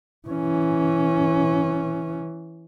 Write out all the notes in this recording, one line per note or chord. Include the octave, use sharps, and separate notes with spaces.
E3 C#4